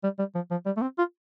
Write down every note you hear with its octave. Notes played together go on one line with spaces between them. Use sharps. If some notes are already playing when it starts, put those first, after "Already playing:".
G3
G3
F3
F3
G3
A3
C4
F4